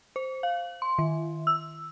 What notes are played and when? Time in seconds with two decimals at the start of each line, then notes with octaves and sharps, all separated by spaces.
0.16 C5
0.43 F5
0.82 C6
0.98 D#3
1.47 E6